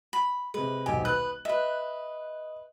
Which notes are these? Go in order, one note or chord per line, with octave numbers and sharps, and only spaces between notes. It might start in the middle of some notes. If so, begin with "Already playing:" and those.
B5
C3 G#3 B4
D#1 B1 G4 G#5
B4 D#6 F#6
B4 D#5 E5